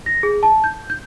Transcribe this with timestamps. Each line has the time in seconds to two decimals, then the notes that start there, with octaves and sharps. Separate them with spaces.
0.06 A#6
0.23 G#4
0.43 A5
0.64 G6
0.90 G6